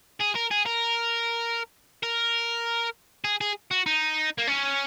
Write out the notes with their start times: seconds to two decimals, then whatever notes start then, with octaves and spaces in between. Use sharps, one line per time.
0.20 G#4
0.35 A#4
0.51 G#4
0.66 A#4
2.03 A#4
3.24 G#4
3.41 G#4
3.71 F#4
3.86 D#4
4.38 A#3
4.48 C#4